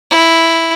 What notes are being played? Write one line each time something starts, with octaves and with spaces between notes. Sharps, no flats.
E4